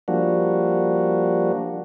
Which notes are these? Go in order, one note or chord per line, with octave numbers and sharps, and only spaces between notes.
F3 G3 A#3 D4 F#4